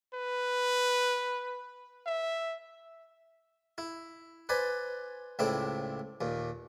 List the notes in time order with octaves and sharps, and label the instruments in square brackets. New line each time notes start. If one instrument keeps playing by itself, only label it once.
[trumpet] B4
E5
[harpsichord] E4
B4 C5 D5 G#5 B5
C#2 A2 C4 D4 E4 D6
D#2 A#2